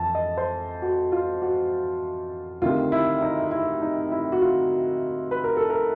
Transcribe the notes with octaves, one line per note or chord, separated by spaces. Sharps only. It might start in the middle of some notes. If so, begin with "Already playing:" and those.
Already playing: F2 E3 A5
D#5
C5
F#4
F4
F#4
D2 C3 D#3 F4
E4
D#4
E4
D#4
E4
F#4
F4
B4
A#4
A4
A#4